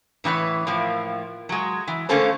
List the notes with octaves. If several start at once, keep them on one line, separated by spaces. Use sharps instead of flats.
A2 E3 C#4 B4 C#5
A2 F3 A#3
F#3 G#3
E3
D3 A3 A#3 C#4 A4 C5